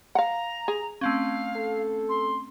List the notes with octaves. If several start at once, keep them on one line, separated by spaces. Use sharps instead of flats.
F5 F#5 A#5
G#4
A3 C4 C#4 F5
A4
C6